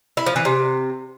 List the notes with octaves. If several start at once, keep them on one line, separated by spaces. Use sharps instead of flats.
E4
F3
E3
C3